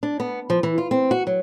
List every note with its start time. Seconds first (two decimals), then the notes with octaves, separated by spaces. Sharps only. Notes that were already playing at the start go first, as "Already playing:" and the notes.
0.03 D4
0.20 B3
0.50 F3
0.63 E3
0.78 F4
0.91 C4
1.11 F#4
1.27 F#3